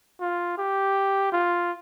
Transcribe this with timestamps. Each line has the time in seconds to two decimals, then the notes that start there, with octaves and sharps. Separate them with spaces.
0.20 F4
0.58 G4
1.33 F4